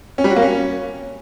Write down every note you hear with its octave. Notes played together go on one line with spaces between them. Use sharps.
C#4
G3
F#4
A#3
C#4